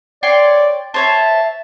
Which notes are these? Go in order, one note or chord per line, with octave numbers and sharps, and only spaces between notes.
C#5 D5 G5 C6
C5 C#5 E5 A5